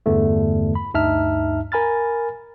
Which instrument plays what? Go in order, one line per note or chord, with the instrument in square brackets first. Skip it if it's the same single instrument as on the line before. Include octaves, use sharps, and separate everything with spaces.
[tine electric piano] E2 G2 D3 E3 A3
B5
D2 G2 D#4 E5 A5 F6
A#4 G#5 B5 F6 A6